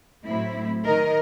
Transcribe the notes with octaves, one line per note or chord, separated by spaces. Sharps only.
A2 F#3 C4 E4
D#3 A#4 D#5